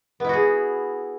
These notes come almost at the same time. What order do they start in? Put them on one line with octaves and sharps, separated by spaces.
B3 E4 F#4 G#4